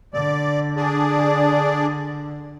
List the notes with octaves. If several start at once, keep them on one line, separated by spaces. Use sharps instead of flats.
D3 D5
D4 G#4 D5